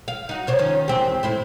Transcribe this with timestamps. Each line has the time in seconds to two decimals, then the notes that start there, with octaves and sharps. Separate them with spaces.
0.08 F5
0.29 D#4 F#4
0.47 C3 C5 C#5
0.59 D#3 F3 C#4
0.88 E2 C4 G4
1.23 A2 E4 C5